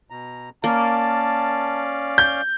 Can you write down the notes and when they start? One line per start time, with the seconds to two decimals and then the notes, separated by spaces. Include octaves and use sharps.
0.10 B2 A#5
0.64 A#3 C#4 D5 F5 A5
2.18 G6